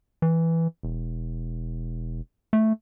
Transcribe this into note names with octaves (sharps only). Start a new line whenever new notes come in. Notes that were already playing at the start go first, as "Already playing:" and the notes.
E3
E1
A3